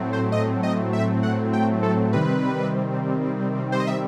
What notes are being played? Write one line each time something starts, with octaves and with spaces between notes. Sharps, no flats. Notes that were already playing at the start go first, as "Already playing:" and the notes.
Already playing: A2 F#3 A3 C4
C5
D#5
D#5
E5
F#5
G5
A4
C3 D#3 G3 C4 B4
C5
D#5
E5